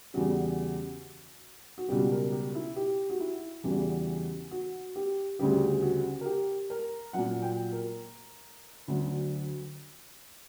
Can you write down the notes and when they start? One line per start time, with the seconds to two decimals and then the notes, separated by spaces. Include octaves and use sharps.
0.14 E2 C#3 G3 F#4
1.78 F#4
1.89 C#2 B2 G3 G4
2.12 A#4
2.32 G4
2.55 E4
2.76 G4
3.10 F#4
3.20 E4
3.64 E2 C#3 E3 G3 F#4
4.51 F#4
4.96 G4
5.39 D2 C#3 G3 G4
5.82 F#4
6.21 A#4
6.26 G4
6.70 A#4
7.13 A#2 F#3 F#5
7.42 G5
7.72 A#4
8.88 D2 D3 F#3